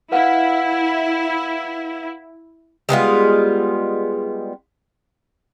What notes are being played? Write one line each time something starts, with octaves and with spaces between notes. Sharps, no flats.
E4 B4 F5 F#5
G3 G#3 B3 F4